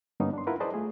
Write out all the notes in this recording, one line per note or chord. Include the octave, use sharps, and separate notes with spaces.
G2 D3 A#3 B3 C#4 D#4
D4 C6
E4 F4 A#4 B4 F#5
G#4 B4 C5 D5 D#5 A5
A3 F4 G#4